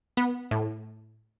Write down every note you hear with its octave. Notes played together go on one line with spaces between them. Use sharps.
B3
A2